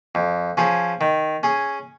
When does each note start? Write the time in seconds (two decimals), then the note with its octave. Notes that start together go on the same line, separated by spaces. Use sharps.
0.15 F2
0.57 F3 C#4 G#4
1.01 D#3
1.43 C#4 G#4